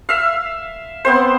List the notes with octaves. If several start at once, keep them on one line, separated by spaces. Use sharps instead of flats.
E5 F5
B3 C4 C5